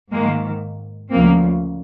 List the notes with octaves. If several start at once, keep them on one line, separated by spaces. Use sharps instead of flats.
G#2 D#3 G#3 A#3
D2 C#3 F3 A#3 C4